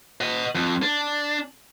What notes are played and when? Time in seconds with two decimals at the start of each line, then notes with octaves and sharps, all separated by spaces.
0.21 D#5 F#5
0.55 F2
0.83 D4